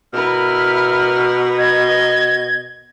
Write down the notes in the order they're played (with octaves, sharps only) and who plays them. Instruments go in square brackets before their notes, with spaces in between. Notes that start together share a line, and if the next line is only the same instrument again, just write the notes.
[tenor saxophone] B2 [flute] E4 [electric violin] A#4 B4 [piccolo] F6
[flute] D#5 [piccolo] G#6